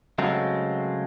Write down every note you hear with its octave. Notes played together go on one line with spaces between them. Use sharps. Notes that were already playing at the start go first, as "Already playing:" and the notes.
C#3 F#3 G#3 A3 C4